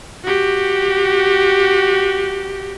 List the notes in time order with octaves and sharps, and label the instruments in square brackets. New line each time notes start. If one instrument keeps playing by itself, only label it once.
[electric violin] F#4 G4